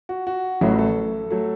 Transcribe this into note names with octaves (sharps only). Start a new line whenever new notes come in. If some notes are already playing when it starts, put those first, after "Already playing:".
F#4
F#4
A1 A2 F#3 A3 E4
A4
F#3 A3